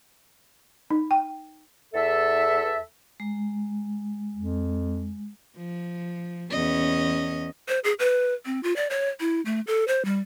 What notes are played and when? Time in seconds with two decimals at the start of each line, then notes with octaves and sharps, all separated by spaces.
0.91 D#4
1.11 G5
1.94 E2 A4 E5
3.20 G#3
4.36 F2
5.56 F3
6.51 E2 C#4 D#5
7.68 C5
7.84 G#4
7.99 B4
8.46 C4
8.63 F4
8.76 D5
8.90 C#5
9.20 E4
9.45 A3
9.67 A4
9.88 C5
10.05 G3